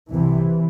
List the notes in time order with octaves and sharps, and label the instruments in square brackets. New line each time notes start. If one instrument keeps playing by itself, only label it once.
[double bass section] C2 C3 E3